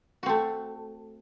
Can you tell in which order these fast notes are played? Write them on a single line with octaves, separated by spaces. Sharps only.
F#4 C4 A3